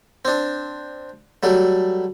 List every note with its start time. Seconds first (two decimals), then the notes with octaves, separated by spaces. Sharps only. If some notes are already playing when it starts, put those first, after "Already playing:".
0.25 C4 D4
1.43 F#3 G3 A3